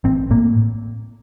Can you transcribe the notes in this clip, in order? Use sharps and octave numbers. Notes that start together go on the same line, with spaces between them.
A1 C4
A2 A#3